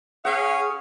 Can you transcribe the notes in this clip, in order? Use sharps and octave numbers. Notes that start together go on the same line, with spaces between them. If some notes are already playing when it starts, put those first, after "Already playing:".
C#4 G#4 C#5 F5 F#5